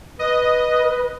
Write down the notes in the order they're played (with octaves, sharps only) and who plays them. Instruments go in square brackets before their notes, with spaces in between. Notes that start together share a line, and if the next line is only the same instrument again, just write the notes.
[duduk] B4 [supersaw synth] D#5